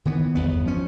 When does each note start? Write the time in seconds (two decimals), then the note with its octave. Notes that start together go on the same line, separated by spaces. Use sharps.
0.05 D#3 E3 B3
0.35 G1 E2 B3
0.65 F3 C#4